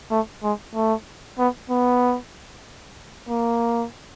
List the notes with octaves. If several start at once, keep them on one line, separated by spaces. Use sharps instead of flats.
A3
G#3
A3
B3
B3
A#3